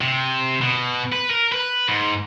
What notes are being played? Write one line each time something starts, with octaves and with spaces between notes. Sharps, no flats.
C3
B2
B4
A#4
B4
G#2